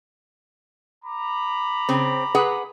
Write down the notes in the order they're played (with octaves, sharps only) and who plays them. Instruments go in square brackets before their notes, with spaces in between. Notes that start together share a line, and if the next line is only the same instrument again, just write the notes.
[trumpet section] A#5 B5 D6
[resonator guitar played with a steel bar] C#3 C4
G#4 B4 F#5